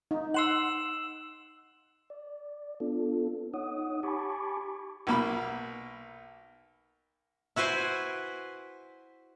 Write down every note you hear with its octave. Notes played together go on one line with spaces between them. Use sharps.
D#4
F#5 C6 E6 E7 F#7
D5
B3 D4 F4 A4
D#4 C#5 F#5 D#6
G4 G#5 A5 B5 C#6 D6
B1 A#3 B5
E4 F#4 B4 C5 G#5